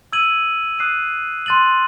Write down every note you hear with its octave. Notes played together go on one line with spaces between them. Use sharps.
E6 G#6 D#7 F#7
D#6 F#6 C7 D#7
C6 F#6 A6 D#7 F#7